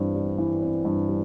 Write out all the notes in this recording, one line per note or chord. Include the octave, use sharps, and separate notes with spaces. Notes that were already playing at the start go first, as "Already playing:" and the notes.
Already playing: G2 E3 G3 C4
G3
E3
C4
G2
G3